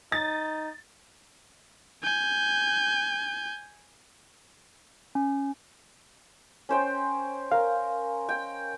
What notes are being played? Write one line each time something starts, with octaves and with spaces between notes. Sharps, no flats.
D#4 A6
G#5 G6
C#4
C#4 C5 G5
A#4 F5
G5